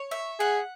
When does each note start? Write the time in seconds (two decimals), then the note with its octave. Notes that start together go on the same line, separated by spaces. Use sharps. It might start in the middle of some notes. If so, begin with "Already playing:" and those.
Already playing: C#5
0.11 E5
0.40 G#4 F#5